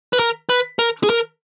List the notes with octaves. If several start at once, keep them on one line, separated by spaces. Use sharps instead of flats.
B4
A#4
B4
A#4
G#4
A#4